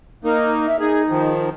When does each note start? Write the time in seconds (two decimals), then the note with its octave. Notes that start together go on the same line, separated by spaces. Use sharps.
0.24 A#3 D#4 A#4
0.66 E5
0.80 D#4 G#4
1.09 D#3 F3